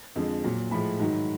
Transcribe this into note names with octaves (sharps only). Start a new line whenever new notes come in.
F2 D3 F3 G#3
A#2 F#3
A2 F3 G#3 B5
G#2 D#3 F#3